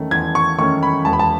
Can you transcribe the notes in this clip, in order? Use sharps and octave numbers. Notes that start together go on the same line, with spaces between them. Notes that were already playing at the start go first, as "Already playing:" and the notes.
Already playing: E2 D#3 A3 C#4
E2 G#6
C#6
D#3 A3 C#4 C#6
B5
E1 A5
B5
A5